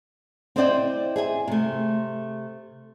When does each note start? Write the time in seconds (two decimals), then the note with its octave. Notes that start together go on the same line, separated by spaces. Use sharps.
0.56 C4 E4 C5 D5 D#5 G5
1.16 G#4 E5 G#5
1.48 C3 A3